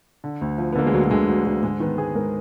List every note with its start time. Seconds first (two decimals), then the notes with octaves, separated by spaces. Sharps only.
0.24 D3
0.41 D2
0.58 F3
0.72 B3
0.76 D3 A#3
0.87 G#3
0.93 D2 F#3
1.04 F#3
1.11 D3 G#3
1.28 D2 F#3
1.45 D3 F#3
1.63 G#2 G#3
1.80 D#3 B3
1.98 G#2 G#4
2.16 G#2 A#4